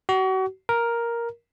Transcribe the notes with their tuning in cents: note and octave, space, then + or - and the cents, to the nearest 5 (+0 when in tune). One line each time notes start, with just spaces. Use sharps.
F#4 +35
A#4 +5